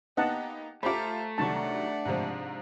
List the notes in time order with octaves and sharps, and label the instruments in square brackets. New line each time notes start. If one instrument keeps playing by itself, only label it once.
[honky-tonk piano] A#3 B3 D#4 [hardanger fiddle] G4 [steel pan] D#5 F#5 A5
[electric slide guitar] A3 [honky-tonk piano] F4 G4 C5 [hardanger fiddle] A#5 [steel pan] B5 D6
[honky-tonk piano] C2 D#3 F#3 [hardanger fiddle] D4 F#5 [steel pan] A5 C#6
[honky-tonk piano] G#2 C3 F3